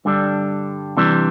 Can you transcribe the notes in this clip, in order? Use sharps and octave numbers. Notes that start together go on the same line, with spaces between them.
G2 D3 G3 D4
C3 E3 G3 D4